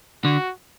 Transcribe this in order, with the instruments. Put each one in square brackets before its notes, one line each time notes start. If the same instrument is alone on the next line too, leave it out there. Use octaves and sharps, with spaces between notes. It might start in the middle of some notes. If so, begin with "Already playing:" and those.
[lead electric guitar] D3 [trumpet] F#4